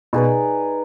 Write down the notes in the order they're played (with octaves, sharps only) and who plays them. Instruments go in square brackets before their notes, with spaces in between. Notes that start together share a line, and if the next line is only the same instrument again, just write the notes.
[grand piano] B2 [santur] D#4 G#4 B4 D5